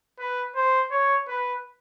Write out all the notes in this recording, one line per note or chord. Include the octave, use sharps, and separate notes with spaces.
B4
C5
C#5
B4